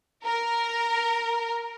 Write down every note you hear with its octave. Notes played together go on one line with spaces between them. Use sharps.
A#4